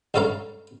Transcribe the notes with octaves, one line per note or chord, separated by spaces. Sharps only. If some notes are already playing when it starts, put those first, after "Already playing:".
C#2 G2 A4 C#5 F5 A#5